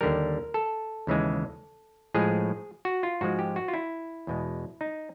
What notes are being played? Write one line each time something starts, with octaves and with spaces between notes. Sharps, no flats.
D#2 D3 G3 A#4
A4
D#2 C#3 E3 G#3
A2 F3 G#3 G#4
F#4
F4
G#2 F3 G#3 F#4
G4
F#4
F4
E4
E2 B2 G#3
D#4